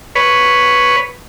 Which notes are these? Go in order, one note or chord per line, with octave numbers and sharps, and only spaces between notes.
B4 C#5